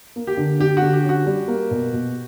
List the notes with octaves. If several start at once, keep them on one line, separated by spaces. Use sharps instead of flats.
A#3
G4
D3
D3 G4
F#4
D3
G4
C#4 F#4
G3
A#3
B2
B2